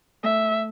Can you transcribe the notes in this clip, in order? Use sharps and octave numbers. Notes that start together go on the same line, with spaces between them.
A3 E5